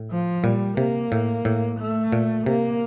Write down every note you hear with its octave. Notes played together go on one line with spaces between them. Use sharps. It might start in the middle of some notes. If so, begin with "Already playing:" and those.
Already playing: A2
F3
A#2 G3
C3 A#3
A2
A2
A3
A#2
C3 A#3